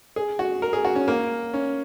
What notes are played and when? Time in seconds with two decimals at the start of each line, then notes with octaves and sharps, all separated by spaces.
0.16 G#4
0.39 F#4
0.62 A#4
0.73 G#4
0.85 F#4
0.95 C#4
1.08 A#3
1.54 C#4